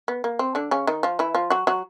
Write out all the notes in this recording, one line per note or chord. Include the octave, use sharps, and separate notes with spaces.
B3
A#3
C4
D3 D4
C#3 C#4
D#3 D#4
F3 F4
E3 E4
F3 F4
F#3 F#4
F#3 F#4